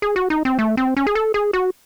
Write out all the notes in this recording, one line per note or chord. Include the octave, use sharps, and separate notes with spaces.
G#4
F#4
D#4
C4
A3
C4
C#4
G#4
A4
G#4
F#4